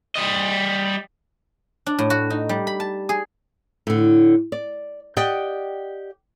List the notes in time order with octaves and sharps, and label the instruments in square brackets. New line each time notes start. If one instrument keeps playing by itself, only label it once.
[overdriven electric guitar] G3 D#5
[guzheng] D4
A2
F#4
D#4
G3
B5
A5
G#4
[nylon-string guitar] A2 D3
D5
G4 D5 D#5 F#5 G5